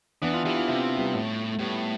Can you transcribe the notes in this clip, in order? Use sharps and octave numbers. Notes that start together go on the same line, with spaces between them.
E3 B3 D4
D4 F4
E3 E4 G4
D4 F4
C3 C4 E4
G3 B3
A2
A3
A2 G3 B3